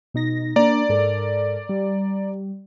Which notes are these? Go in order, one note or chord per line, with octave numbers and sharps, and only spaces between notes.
B2 D#4 A#6
A#3 D4 D5 A#5
G#2 A4 A#4
G3